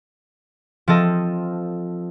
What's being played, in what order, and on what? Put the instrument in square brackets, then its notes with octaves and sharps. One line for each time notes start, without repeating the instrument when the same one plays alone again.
[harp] F3 C4 A4 D#5